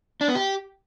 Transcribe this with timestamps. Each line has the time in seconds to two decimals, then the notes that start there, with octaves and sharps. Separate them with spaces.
0.21 D4
0.28 B3
0.35 G4